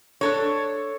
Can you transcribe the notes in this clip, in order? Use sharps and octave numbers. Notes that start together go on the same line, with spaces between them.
D4 A4 C#5